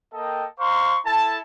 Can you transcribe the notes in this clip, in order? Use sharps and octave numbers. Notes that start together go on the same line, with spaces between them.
A#3 A4 D#5 G5
C5 F5 A#5 C6 C#6
E4 A4 A5